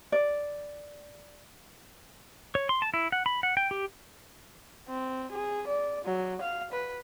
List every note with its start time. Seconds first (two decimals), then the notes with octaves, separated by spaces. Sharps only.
0.12 D5
2.55 C#5
2.69 C6
2.82 A5
2.94 E4
3.12 F#5
3.26 B5
3.43 F#5
3.57 G5
3.71 G4
4.88 C4
5.31 G#4
5.67 D5
6.05 F#3
6.41 F5
6.72 B4